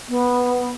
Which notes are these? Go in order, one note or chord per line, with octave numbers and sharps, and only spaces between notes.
B3